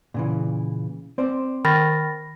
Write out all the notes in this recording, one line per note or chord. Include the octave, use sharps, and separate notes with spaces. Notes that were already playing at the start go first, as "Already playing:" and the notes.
A#2 C#3 E3
C4 C5 D5
D#3 B5 A6 A#6